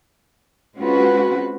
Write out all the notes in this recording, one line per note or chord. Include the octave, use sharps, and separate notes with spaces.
G#3 C4 C#4 F4 F#4 B4